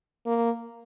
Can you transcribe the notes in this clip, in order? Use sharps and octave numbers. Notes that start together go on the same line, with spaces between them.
A#3